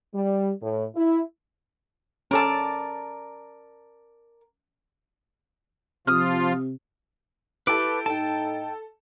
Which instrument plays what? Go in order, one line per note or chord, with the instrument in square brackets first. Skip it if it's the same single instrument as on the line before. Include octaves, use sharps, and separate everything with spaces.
[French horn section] G3
A2
E4
[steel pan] C#4 A4 [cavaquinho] A#4 D5 A5
[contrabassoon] C3 [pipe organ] F3 F4 [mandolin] D#6 F6
[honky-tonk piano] E4 G4 A4 [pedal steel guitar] B4 D6 [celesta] D7
[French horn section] A2 D#4 [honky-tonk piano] A4 [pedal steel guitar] G5 A5